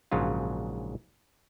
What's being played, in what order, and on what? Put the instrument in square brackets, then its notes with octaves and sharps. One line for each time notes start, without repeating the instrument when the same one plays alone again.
[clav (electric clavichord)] A#1 G#2 C#3 F#3 F4